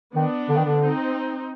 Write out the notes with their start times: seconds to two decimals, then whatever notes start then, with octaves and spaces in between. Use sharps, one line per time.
0.15 D#3 B3 D4
0.49 D3
0.57 D#3
0.65 D3
0.82 C4 D#4